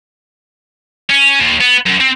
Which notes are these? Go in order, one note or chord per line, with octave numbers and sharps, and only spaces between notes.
C#4
D#2
B3
F#2
C4